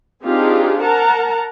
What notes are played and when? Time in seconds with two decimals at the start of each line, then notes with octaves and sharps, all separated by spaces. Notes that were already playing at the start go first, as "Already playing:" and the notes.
0.25 C4 D4 D#4 F4 G4 G#4
0.82 A#4 F#5 A5 A#5